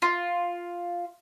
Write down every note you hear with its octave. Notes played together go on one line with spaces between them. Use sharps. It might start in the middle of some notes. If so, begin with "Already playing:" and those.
F4